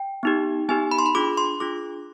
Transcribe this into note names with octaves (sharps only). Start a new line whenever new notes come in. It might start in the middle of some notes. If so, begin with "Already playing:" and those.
Already playing: G5
B3 D#4 G4
B3 D#4 G4 G#5
B5
C6
B5
D4 F4 G#4 D6
C6
D4 F4 G#4 D6